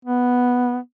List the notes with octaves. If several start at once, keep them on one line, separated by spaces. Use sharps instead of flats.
B3